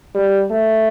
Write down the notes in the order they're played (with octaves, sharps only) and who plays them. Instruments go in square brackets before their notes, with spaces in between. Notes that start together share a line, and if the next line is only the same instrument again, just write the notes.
[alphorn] G3
A3